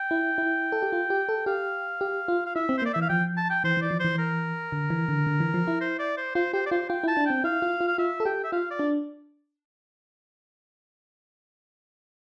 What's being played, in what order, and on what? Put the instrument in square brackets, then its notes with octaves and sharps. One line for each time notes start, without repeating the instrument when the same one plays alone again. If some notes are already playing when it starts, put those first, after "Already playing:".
Already playing: [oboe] G5
[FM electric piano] E4
E4
A4
G4
F4
G4
A4
[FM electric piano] G4 [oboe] F5
[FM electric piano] G4
F4
[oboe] F5
[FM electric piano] E4 [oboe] E5
[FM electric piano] C4
[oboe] C5
[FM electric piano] A#3 [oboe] D5
[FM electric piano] E3 [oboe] E5
[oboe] F5
[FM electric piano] F3 [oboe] G5
[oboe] A5
G5
[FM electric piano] E3 [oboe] C5
[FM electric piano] E3
[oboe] D5
[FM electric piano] F3
[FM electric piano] E3 [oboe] C5
[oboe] A#4
[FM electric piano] D3
E3
D3
D3
E3
F3
E4
[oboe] C5
D5
C5
[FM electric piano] F4 [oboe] C5
[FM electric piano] G4 [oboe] C5
[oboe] D5
[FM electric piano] F4 [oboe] C5
[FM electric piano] F4 [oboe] G5
[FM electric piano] E4 [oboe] A5
[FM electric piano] D4
[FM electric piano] C4 [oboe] G5
[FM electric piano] E4 [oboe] F5
[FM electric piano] F4
F4
[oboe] F5
[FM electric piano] F4 [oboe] E5
[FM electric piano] A4
[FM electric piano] G4 [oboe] G5
[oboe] E5
[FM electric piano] F4 [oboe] F5
[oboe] D5
[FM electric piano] D4